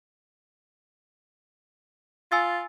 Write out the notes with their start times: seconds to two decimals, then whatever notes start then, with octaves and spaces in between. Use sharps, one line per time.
2.32 F4 G#5 E6 A6